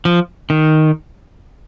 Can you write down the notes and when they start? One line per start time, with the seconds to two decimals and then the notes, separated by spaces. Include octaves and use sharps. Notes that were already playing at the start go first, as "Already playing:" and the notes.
0.05 F3
0.50 D#3